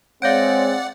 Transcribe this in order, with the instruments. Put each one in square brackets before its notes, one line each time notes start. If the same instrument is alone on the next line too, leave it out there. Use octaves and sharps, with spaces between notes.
[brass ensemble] G#3 C4 [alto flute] C#5 [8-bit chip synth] D5 F#5 [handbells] F5 G6 D7